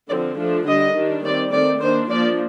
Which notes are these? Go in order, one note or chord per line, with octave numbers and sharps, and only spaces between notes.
D3 F3 C4 D5
F3 A3 D4
D3 G3 D4 D#5
D#3 G3 D4
D#3 G3 C4 D5
D#3 A3 C4 D5
D#3 A#3 D4 C5
F3 A#3 D4 D5